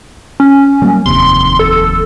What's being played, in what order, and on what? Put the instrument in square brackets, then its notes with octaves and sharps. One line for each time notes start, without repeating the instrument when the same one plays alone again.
[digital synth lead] C#4
[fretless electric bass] F#3 G3 A#3
[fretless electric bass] F1 D#2 C3 [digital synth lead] C6
[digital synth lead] A4